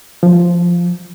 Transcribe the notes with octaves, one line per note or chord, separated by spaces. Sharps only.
F3